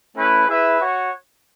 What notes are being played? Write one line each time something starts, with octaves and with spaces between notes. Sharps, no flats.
A3 C#4 E4 B4
E4 G#4 B4 E5
F#4 C#5